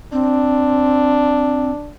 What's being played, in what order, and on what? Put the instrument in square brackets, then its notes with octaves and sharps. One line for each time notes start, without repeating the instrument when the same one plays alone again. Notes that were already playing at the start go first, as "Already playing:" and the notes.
[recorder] C4 [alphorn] D4